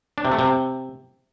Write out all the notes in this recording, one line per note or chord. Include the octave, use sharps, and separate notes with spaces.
D4
C3
A3
C3